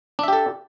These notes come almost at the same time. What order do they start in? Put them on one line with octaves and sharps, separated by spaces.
D4 E5 G4 A4